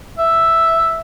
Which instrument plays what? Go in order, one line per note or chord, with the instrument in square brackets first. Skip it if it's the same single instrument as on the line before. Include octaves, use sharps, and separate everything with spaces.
[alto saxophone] E5